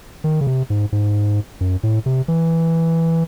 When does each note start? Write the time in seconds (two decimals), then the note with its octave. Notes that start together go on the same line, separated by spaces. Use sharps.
0.24 D#3
0.41 C#3
0.47 C3
0.70 G#2
0.92 G#2
1.61 F#2
1.83 A2
2.06 C3
2.28 E3